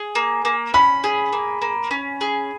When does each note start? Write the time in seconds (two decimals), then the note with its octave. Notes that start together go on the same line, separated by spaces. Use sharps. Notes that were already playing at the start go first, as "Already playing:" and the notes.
Already playing: G#4
0.15 A#3
0.45 A#3
0.74 C#4 B5
1.04 G#4
1.33 A#3
1.62 A#3
1.91 C#4
2.21 G#4